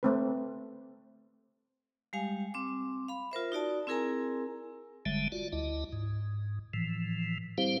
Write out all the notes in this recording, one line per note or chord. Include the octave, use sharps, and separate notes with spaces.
A3 C4 B4
G3 G#3 G4 F5 G#5
C4 D6
F5 B5
F4 A#4 C5 E5
D#4 F#4 D5 A5
C4 E4 G#4 A#4 G#5 A#5
F#1 D3 G3 G#3 E5 A5
F4 F#4 D5
D2 E4 D#5
G#2
A2 E3 F3
G3 C4 E4 G4 C5 F5